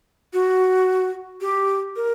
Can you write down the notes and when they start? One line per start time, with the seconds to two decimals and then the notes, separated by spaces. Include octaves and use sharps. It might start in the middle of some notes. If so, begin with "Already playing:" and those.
0.33 F#4
1.41 G4
1.96 A#4